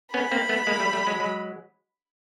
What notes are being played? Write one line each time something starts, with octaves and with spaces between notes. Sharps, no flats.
B3 C#4 B5
A#3 C4
A3 B3
G#3 A#3
G3 A3
G3 A3
F#3 G#3
F#3 G#3